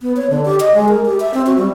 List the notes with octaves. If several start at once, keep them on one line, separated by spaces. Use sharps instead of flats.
B3
C#5
D3
G4
D#5
G#3
A#4
G4
E5
C4
F#4
G3